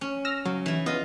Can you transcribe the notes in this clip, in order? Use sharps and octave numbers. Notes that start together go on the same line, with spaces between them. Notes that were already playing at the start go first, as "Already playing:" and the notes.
C#4
E6 F6 A#6
C#3 F#3
E3 E4
B3 F4 D#5